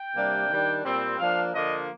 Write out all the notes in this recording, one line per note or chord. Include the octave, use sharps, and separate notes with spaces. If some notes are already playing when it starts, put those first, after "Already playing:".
Already playing: G5
C3 G3 A#3 D4
D#3 G3 D4
A#2 G3 C4
F3 A#3 D4 F5
D3 F3 A#3 D4 D#5